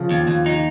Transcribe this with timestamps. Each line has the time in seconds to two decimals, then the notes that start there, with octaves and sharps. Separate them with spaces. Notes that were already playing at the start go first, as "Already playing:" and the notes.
Already playing: C#3 F3
0.11 D#2
0.27 D#2
0.46 D#4